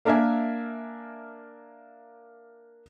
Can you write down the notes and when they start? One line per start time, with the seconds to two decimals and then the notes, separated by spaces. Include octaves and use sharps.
0.05 A#3 D4 A#4 E5 G#5